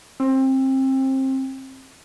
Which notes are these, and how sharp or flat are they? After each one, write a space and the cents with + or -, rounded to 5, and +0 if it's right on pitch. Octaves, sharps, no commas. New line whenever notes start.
C4 +25